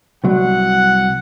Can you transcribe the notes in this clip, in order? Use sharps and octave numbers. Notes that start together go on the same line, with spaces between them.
C2 F#3 F#5